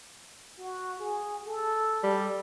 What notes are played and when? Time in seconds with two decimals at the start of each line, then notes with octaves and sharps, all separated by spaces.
0.58 F#4
1.00 G#4
1.46 A4
2.03 G3